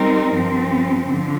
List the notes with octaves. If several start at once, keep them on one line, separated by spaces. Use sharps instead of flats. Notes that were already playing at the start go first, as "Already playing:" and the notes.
Already playing: G3 C4 D#4 A#4
G2 F3 C4
D3 F3